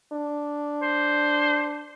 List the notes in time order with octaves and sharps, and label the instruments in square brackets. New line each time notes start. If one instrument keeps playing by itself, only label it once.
[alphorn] D4
[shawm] C5